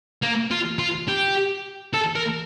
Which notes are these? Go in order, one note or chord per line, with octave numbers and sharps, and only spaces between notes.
A#3
F4
F4
G4
A4
A#4